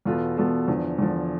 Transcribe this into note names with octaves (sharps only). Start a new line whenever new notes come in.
E2 B2 B3 F4 A4
E2 B2 B3 F4 A4
E2 D3 F3
E2 D3 F3